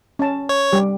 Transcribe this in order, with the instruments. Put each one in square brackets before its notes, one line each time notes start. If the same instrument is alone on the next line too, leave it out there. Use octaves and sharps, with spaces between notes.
[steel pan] C#4 A5
[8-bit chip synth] C#5
[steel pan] G3 G4